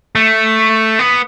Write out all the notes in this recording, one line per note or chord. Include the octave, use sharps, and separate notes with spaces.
A3
B3